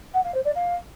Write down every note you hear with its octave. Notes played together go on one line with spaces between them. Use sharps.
F#5
F5
C5
D5
F5